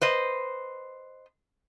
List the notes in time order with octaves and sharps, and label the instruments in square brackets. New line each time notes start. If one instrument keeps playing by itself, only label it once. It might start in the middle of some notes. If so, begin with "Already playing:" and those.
[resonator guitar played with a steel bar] B4 C5 D#5